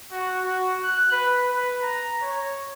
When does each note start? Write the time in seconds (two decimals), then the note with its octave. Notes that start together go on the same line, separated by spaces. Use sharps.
0.12 F#4
0.44 F#4
0.83 F#6
1.12 B4
1.47 B4
1.83 A#5
2.22 C#5